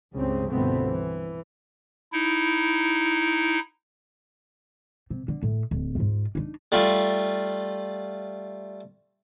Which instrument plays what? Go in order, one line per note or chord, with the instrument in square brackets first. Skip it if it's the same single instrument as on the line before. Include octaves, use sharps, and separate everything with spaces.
[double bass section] C#2 G2 C#3 C4
G1 C2 B2 A3 B3 C4
E3
[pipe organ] D#4 E4
[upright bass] C3
D3
A2
D1
G#2 F4
D4 D#4
[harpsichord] G3 A3 F4